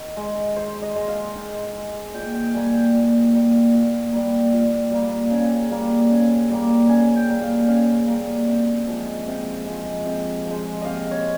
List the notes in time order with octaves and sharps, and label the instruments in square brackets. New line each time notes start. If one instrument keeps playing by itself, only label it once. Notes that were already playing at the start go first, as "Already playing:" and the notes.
Already playing: [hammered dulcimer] D#3
G#3
D#3 C5
D#5
G#3
F5
D#3
G#3
A#2 G5
G5
G3 A#3 G#5
G5
A#2
G3 A#3
A#2
G3 A#3
A#2
G3 A#3
C#3
G3 A#3
C#3
G3 A#3
C#3 G#5
G5
G3 A#3
F5
C#3 F5
G3 A#3
C3
F3 G#3
C3
F3 G#3
C3
F3
G#3
C3 D#5 F5
C#5